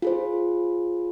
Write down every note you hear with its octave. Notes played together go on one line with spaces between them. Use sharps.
F4 G#4 C5